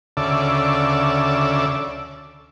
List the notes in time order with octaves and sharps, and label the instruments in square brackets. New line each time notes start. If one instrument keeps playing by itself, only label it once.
[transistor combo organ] D2 C#3 A4 D5 E5